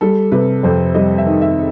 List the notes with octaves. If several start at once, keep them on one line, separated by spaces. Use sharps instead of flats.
G3 A4
C3 B4
F2 C5
G3 D#5
E5
D#3
E5